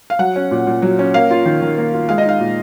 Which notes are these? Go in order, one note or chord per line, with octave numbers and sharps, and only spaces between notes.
F5
F#3 F#5
C#4
A#2
A#2
F#3
C#4
A#3 F5
F4
D#3
D#3
A#3
F4
G#3 F5
D#5
D#4 F5
A#2